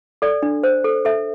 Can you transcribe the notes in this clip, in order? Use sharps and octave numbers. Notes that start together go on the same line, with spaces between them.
A4 D5
D4
C5
A4
A4 E5